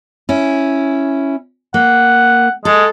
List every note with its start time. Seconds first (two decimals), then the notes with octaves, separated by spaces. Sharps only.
0.29 C#4 E4
1.74 A#3 F#5
2.65 G#3 A4